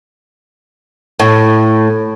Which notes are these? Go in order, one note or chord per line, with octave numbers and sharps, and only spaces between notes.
A2